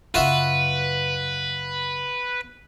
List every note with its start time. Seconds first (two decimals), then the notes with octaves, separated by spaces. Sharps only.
0.14 F#2 C#3 F4 F#4 B4 E5